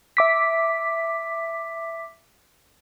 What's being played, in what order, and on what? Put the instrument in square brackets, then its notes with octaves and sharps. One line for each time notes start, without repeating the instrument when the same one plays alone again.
[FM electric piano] E5 D6 B6